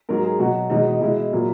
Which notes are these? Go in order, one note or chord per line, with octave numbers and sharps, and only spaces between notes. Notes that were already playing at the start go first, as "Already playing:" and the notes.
G#2 F#3 A#4
G#4
B2 F#3 F#4
E2 B2 G#3 D#4
B2 G#3 E4
A#2 F#3